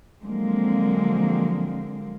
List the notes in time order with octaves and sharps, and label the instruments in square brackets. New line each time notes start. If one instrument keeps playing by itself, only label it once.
[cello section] D3 F3 F#3 G#3 A#3 C4